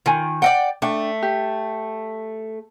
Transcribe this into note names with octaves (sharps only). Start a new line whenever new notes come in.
D#3 F4 G#5
D5 D#5 F#5 G5
A3 D4 G5
G4